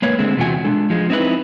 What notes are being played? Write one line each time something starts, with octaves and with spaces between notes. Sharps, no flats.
G#3 A#3 B4 C#5
D3 G#3 A3 C4
E2 C3 F4 F#4 G5 G#5
G#3 D4 A4
F3 G#3
C4 D#4 E4 B4